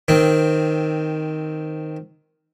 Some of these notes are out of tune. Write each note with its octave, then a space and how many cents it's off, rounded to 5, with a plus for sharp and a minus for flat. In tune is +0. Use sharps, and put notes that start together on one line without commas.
D#3 +0 C4 +0